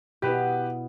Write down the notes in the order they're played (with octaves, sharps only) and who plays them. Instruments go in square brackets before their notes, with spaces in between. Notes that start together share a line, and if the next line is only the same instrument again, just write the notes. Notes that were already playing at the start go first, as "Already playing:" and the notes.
[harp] B2 B3 E4 [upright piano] G4 B4